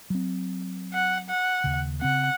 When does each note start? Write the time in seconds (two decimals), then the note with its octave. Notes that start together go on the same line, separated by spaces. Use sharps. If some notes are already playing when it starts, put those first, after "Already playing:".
0.10 F#3 C4
0.93 F#5
1.29 F#5
1.64 D#2 C#3
2.02 C#3 C4 F#5